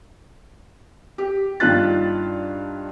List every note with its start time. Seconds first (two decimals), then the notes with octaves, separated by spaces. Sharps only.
1.18 G4
1.60 G2 D#3 D4 F4 F#6 A6